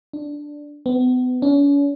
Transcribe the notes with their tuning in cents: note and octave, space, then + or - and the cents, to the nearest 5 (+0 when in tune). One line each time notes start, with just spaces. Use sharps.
D4 +0
B3 +35
C#4 +40